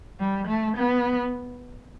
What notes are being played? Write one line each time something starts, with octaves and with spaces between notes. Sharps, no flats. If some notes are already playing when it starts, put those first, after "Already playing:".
G3
A3
B3